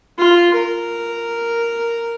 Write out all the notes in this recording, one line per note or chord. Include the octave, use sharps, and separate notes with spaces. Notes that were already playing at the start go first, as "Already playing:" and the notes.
F4
A#4